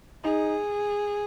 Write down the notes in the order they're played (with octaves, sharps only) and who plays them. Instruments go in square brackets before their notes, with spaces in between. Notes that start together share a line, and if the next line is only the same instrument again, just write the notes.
[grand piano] D#4 [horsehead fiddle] G#4